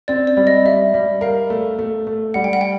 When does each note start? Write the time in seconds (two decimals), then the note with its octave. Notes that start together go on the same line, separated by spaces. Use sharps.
0.08 C4 D5
0.27 D5
0.37 G3
0.47 D#5
0.65 G3 E5
0.94 G3
1.21 A#4 F5
1.50 A3
1.79 A3
2.07 A3
2.34 G3 F#5
2.44 G5
2.53 F#5
2.61 G5